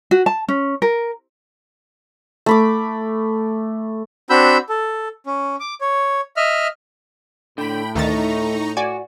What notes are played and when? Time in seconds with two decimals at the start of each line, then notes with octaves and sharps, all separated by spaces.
0.11 F#4
0.26 A5
0.48 C#4
0.82 A#4
2.46 A3 B5 D6
4.30 C4 D4 F#4 B5 E6 G6
4.69 A4
5.26 C#4
5.60 D6
5.81 C#5
6.37 D#5 E5 F6
7.58 A2 D3 G5 B5
7.95 D2 D#3 A3 D#4 A#5 C#6 A6
8.77 F#4 D5 G#5